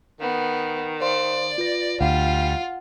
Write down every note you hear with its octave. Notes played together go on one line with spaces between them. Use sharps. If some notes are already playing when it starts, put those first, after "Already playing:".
D#3 B3
C5 D5 F5 C6
F4 B4 A#6
D2 G3 F4 F#5